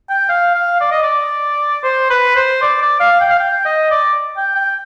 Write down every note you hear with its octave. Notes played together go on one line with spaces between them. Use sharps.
G5
F5
F5
D5
D#5
D5
C5
B4
C5
D5
D5
F5
G5
F5
G5
D#5
D5
G5
G5